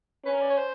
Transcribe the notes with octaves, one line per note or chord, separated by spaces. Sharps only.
C#4 B4
A#4
D5
C#5
C5